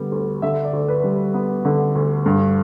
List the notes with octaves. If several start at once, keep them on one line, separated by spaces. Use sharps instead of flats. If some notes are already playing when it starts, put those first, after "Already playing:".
Already playing: D3 G3 B3
D2
D3 E5
D5
D2
B4
G3
B3
D3
D2
G2